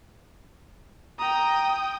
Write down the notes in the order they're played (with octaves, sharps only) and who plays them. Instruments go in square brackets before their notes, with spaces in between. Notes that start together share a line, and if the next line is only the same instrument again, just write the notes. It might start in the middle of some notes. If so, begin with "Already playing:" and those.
[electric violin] G5 D#6 [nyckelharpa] A#5